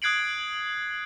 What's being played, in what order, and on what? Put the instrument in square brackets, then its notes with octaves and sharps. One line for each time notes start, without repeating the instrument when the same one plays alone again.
[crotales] D#6 F#6 G#6 C7 D7 F#7